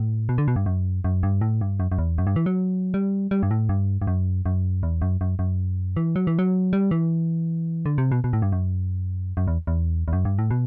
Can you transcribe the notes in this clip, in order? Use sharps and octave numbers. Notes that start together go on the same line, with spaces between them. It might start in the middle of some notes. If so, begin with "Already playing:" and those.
Already playing: A2
B2
D3
B2
G2
F#2
F#2
G2
A2
G2
F#2
F#2
E2
F#2
G2
E3
F#3
G3
G3
G2
A2
G2
G2
F#2
F#2
E2
F#2
F#2
F#2
E3
F#3
E3
F#3
G3
E3
D3
C3
B2
B2
A2
G2
F#2
F#2
E2
E2
E2
F#2
G2
A2
B2